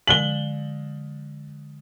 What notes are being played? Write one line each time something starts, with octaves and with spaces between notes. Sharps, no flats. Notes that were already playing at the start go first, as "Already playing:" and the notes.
D3 F3 G#3 F#7 G7